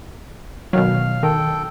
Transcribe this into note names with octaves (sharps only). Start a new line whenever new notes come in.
B2 D#3 F#3 F5
D#3 A4 G5